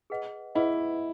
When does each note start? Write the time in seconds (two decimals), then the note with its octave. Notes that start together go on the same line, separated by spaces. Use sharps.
0.10 G#4 B4 D#5 F#5
0.55 E4 G#4 B4 D#5 F#5